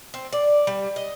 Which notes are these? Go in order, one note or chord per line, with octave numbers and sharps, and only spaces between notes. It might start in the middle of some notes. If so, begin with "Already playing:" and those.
C4
D5
G3
D#5